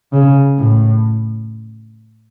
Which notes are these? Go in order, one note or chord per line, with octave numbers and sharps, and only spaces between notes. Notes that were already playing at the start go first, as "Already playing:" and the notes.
C#3
A2